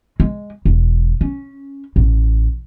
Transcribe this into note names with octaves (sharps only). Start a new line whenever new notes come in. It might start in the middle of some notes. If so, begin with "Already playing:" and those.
G#3
E1
C#4
A1